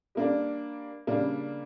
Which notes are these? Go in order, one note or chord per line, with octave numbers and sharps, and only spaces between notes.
G3 A#3 D4
C#3 G3 A#3 D4